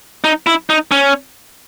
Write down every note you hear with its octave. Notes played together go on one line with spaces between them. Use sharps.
D#4
E4
D#4
C#4